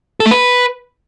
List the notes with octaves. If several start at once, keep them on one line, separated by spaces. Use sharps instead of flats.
A4
A3
B4